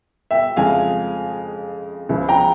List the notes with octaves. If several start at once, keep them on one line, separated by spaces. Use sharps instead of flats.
E5 G5
F2 C#3 F3 G#3 F5 G#5
C#2 C#3 F3
G5 A#5